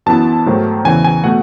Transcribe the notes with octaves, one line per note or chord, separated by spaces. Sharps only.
F#2 E3 B3 E4 A5
G#2 D#3 F#3 A3 D#4
E2 C#3 E3 G#5
G#5
B2 A3 F#5